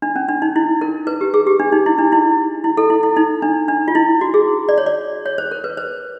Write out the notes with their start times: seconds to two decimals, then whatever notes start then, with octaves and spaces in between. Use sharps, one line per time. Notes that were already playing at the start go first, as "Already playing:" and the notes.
0.02 D4
0.16 C#4
0.28 D4
0.42 D#4
0.56 E4
0.81 A#4
1.07 B4
1.21 G4
1.34 G#4
1.47 G4
1.60 D4
1.72 D#4
1.86 E4
1.98 D4
2.12 E4
2.64 E4
2.77 A4
2.90 E4
3.03 E4
3.17 D#4
3.42 D4
3.68 D4
3.88 F4
3.95 E4
4.21 F#4
4.34 G#4
4.69 D5
4.78 C#5
4.86 D5
5.26 C#5
5.38 C5
5.51 A#4
5.64 B4
5.77 C5